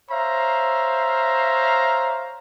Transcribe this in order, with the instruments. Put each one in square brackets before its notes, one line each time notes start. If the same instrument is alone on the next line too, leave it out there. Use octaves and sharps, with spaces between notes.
[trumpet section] C5 C#5 E5 F5 A#5